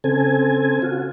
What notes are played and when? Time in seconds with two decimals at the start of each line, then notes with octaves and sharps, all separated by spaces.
0.04 C#3 C4 A4 G#5
0.82 F4 F#4